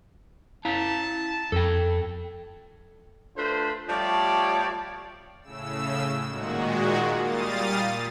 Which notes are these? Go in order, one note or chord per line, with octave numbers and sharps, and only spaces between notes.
E4 F5 A5 A#5
F2 A4 G5
A3 D4 F4 B4 C5
F3 G3 A3 G4 C#5 D5
A2 C#3 E6
A#2 D#3 G#3 F#4
A#2 G3 F5 D#6 A6